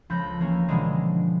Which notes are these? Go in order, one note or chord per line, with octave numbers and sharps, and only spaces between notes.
C#2 F3 A4 B5 G6 A#6
E3 A#3 C#4
B2 D3 E3 F3 G3 G#3